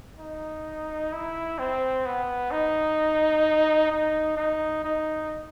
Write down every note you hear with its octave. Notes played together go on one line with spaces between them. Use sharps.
D#4
E4
C4
B3
D#4
D#4
D#4
D#4